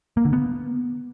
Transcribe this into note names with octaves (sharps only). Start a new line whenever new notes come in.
A#3
D3
B3